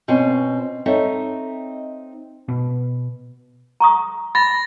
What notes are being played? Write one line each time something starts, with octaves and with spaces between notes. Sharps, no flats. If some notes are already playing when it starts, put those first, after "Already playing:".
B2 C4 C#4 F4 G#5
C4 D#4 A4 C#5 D#5 E5
B2
A#5 C#6 D#6
B5 A6 A#6